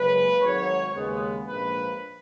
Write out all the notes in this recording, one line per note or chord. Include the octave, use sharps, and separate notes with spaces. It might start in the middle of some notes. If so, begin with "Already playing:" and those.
Already playing: F#1 F#2 C#3 G#3 B4
G#1 G#2 F#3 C#5
D#2 C#3 G#3 B3
A#1 G#2 F3 A#3 B4